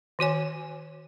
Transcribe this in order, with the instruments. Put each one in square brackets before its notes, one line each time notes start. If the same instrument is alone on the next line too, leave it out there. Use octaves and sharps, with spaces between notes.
[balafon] D#3 F#4 C#5 G#5